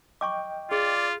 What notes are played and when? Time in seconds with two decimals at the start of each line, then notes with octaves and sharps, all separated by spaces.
0.21 D#5 G5 C#6 D6
0.71 F4 G#4 D5